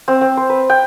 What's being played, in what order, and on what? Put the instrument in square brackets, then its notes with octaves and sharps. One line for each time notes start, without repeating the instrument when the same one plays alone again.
[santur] C4
C4
C5
B4
G5